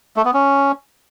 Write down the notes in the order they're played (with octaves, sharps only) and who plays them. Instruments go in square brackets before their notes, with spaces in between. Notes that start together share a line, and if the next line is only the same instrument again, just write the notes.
[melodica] A3
B3
C#4